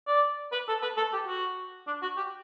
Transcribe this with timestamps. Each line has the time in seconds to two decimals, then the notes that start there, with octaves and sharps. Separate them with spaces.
0.07 D5
0.52 B4
0.68 A4
0.82 B4
0.97 A4
1.13 G4
1.27 F#4
1.87 D4
2.02 F#4
2.17 G4